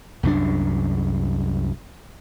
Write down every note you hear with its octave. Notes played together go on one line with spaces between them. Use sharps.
C2 F#2 F3 D4